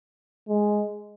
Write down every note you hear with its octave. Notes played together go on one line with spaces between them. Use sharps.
G#3